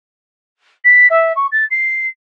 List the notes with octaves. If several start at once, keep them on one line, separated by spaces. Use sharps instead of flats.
B6
E5
C#6
A6
C7